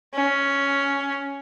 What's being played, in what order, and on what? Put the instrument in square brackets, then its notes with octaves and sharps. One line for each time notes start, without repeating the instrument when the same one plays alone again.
[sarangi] C#4